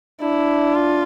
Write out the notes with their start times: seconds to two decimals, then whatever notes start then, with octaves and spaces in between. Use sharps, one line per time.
0.21 D4 E4
0.75 F4